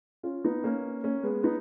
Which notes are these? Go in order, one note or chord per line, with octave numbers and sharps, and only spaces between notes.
C#4 F4
B3 D#4
A#3 C#4
A#3 C#4
G#3 B3
B3 D#4